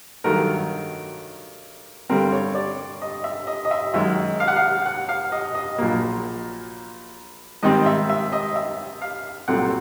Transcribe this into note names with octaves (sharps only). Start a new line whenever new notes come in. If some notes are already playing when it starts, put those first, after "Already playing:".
G2 D#3 F#3 A3 A#4
G2 D3 G3 C4 A#4
C#5
D5
D#5
E5
D#5
D#5
E5
F#2 D#3 G#3 E5
F5
F#5
F5
F#5
F5
D#5
D#5
A#1 A#2 F#3 A#3
G#2 D#3 G3 C4 D#5
E5
E5
D#5
E5
F5
C2 A#2 F#3 A3 C4 F#5